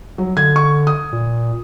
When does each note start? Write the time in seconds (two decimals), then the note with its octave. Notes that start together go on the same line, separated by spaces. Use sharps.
0.18 F#3
0.37 D3 G#6
0.56 C#6
0.87 D#6
1.13 A#2